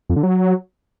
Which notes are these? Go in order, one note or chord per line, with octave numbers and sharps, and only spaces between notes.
F2
D3
F#3